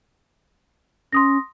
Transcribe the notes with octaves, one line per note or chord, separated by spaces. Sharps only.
C#4 C6 D#6 A#6